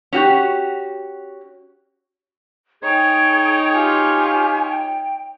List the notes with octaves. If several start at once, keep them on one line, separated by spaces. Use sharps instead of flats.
C#4 F#4 G4
D#4 G#4 C#5 G5 G#6
F4 G4 G#5
G5